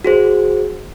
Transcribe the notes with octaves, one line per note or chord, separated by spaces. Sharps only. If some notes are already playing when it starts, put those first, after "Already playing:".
F#4 G#4 C5